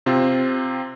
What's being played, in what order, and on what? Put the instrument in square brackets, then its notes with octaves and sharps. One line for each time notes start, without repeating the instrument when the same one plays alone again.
[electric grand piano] C3 C4 F4